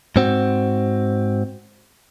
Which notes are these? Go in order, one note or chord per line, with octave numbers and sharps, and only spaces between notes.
G#2 C4 F#4